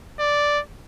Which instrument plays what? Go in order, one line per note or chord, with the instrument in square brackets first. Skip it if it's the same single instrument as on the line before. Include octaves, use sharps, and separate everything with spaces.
[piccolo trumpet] D5